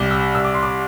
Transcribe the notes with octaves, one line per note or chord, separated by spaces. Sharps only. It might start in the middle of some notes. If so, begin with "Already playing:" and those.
Already playing: C2 G3 D6
E6
C2 E6
D6
C6
D6